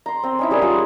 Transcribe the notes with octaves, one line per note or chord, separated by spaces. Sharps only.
A#5 C6
C4 A#5
C#4 D#4 E4
G3 G#4 A#4 G#5
G3 F4 G#4 F#5